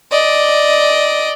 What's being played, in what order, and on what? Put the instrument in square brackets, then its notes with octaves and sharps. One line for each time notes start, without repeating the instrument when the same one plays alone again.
[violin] D5 D#5